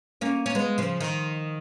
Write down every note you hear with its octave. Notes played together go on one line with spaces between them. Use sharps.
A#3 C#4
C#4
G#3 B3
C#3 F3
D#3